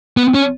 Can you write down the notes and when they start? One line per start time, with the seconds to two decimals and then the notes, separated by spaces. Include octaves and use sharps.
0.17 B3
0.34 C#4